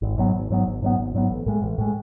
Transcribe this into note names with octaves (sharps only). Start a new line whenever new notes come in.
G#1
G#2 F#3 B3
G#1
G#2 F#3 B3
G#1
G#2 F#3 B3
G#1
G#2 F#3 B3
A1
A2 G#3
A1
A2 G#3